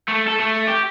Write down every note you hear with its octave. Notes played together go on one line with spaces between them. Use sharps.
A3
A4
A3
G4